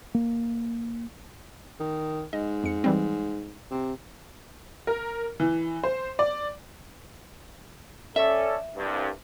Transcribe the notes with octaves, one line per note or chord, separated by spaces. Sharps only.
A#3
D#3
G#2 D#5
F2 C#7
E3 G3 C4
C3
A#4
E3
C5
D5
C#4 A4 D5 E5
C2 G2